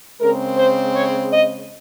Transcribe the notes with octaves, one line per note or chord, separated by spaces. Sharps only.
C#3 G#3 C4 A#4
C5
C#5
D#5